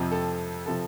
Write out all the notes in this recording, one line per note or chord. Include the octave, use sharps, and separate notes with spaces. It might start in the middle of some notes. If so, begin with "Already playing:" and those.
Already playing: F2 C3 F3
A4
C3 F3 A4